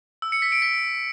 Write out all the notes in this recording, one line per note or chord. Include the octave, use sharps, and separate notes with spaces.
E6
C#7
B6
D7
B6